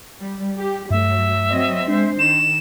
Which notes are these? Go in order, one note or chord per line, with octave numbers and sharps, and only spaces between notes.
G3
G4
G2 F#3 A3 E5
F#3 C4 D#5
G#3 D4 C5
D#3 E7